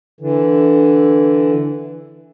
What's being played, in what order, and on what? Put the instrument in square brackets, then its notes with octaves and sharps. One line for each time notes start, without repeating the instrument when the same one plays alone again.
[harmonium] D3 E3